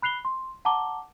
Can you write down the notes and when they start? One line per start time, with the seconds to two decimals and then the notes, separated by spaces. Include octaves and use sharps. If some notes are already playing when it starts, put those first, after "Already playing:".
0.02 B5 F#6 C7 F7 G7
0.25 C6
0.65 F#5 A5 A#5 D6 G7